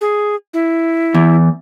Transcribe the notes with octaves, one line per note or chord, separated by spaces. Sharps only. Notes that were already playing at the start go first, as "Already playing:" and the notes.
G#4
E4
E2